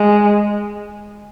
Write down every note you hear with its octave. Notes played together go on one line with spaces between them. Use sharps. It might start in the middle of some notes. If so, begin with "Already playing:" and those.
Already playing: G#3